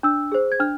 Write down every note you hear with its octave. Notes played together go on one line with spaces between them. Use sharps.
D4 E6
G#4 C5
G#6
D4 F6